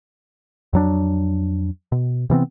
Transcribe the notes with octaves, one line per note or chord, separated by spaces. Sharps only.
F2 F#3 D4
B2
C3 E3 B3 C4